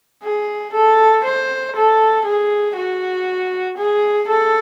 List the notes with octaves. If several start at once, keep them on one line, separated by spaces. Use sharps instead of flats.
G#4
A4
C5
A4
G#4
F#4
G#4
A4